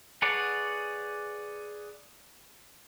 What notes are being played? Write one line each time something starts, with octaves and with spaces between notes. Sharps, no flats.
G#4 B4 C#5 D5 F#5